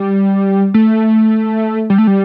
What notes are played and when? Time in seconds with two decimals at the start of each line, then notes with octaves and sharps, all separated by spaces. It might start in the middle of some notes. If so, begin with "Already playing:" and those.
Already playing: G3
0.74 A3
1.90 G3
1.98 A3
2.07 G3